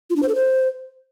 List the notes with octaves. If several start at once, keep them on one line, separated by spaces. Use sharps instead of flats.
F4
D4
C5
A4
C5